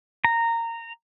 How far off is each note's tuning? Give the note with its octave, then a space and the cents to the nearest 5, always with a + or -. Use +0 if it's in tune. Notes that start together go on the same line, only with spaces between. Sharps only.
A#5 -15